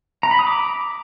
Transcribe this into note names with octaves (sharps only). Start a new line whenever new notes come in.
A#5
B5
D#6
D6